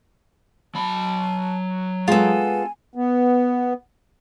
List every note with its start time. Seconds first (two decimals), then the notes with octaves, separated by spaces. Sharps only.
0.75 F#3 A5 B5
2.08 G#3 B3 F4 A4 G#5
2.95 B3